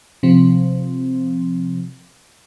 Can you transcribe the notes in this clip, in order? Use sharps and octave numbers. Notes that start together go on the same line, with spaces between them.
C3 F3 C4